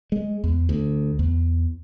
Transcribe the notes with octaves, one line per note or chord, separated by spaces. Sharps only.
G#3
E2
D2
E2